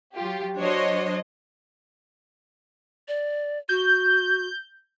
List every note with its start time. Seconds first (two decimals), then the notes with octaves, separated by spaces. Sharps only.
0.14 F#3 F4 G4
0.56 F#3 D4 F#4 C5 C#5 D#5
3.08 D5
3.69 F#4 G6